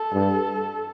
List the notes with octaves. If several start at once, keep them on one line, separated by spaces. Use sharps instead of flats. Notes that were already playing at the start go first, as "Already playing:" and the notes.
Already playing: A4
G2